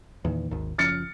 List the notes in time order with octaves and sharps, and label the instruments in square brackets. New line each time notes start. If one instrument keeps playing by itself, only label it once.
[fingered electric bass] E2 A#2 D#3
G#1 D#2
[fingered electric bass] F#1 F3 C#4 [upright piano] F6 A6 C#7